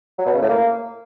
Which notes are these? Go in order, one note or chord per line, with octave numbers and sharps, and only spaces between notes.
F#3
B2
C#3
A2
A#3